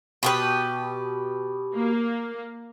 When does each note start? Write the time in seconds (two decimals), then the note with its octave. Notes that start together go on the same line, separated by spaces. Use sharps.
0.23 B2 G4 B4
1.75 A#3